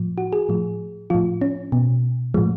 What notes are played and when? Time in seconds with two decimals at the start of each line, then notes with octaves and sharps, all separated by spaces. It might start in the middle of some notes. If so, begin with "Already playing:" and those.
Already playing: A2 F3
0.18 F#4
0.33 G#4
0.49 A2 F3
1.10 A2 F3 F4
1.41 C#4
1.72 B2
2.34 A2 F3 G#3